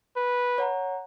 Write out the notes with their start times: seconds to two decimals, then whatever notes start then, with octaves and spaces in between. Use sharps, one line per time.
0.16 B4
0.58 C#5 F#5 A#5